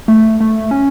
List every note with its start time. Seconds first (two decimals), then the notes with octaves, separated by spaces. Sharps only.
0.08 A3
0.40 A3
0.71 C#4